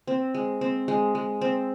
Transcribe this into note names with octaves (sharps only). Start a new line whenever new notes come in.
C4
G#3
C4
G#3
G#3
C4